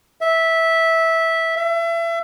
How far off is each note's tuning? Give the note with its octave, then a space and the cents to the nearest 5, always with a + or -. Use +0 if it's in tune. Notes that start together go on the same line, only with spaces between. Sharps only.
E5 -10
E5 +30